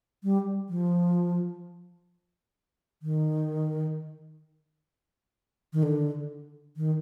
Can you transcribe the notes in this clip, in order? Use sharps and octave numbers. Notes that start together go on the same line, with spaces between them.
G3
F3
D#3
D#3
D3
D#3